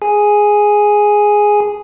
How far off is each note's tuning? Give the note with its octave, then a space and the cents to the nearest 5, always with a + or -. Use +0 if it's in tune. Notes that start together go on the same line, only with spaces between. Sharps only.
G#4 +0 G#5 +0